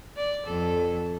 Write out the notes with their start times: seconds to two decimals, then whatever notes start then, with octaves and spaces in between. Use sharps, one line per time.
0.17 D5
0.46 F2 A4